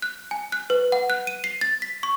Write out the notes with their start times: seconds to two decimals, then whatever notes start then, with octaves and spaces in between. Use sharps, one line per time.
0.02 F#6
0.31 G#5
0.52 F#6
0.70 B4
0.92 F#5
1.10 F#6
1.27 D#7
1.44 C7
1.61 A6
1.82 B6
2.03 C#6